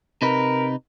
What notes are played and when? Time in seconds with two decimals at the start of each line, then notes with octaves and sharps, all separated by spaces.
0.22 C3 D#4 A#4 B4